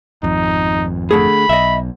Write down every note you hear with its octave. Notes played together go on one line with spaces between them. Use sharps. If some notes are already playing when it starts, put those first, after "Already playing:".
G#1 F2 D#4
D3 A3 G#4 B5
B1 D#5 E5